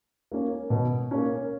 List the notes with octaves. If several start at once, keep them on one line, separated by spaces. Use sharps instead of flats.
A#3 C#4
B2
A#3 C#4